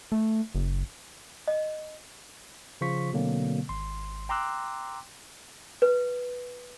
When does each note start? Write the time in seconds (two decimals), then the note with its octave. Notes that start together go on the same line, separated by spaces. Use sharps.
0.12 A3
0.55 F#1
1.48 D#5
2.81 C#3 F3 F4 C5 C#6 B6
3.13 B2 D3 F#3 A#3 C4
3.69 G#1 C6
4.29 G5 A#5 C6 D6 E6 F#6
5.82 B4